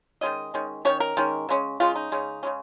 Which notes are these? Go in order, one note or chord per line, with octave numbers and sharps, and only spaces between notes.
D#3 G#3 C#4 D#5
D#3 G#3 C#4
D#3 G#3 C#4 C#5
A#4
D#3 G#3 C#4
C#3 G#3 C#4
C#3 G#3 C#4 F4
D#4
C#3 G#3 C#4
C#3 G#3 C#4